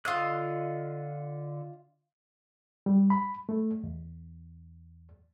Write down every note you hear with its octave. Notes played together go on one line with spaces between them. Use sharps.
D3 F4 D#5 E6 F#6
G3
B5
A3
E2